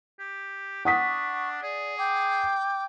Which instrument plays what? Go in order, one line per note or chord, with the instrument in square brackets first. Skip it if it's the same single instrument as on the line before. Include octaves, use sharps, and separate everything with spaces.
[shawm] G4
[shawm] D4 [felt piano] F#5 D#6 B6 [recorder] C#6
[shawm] G#4 [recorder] D5
[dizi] G5 [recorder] D6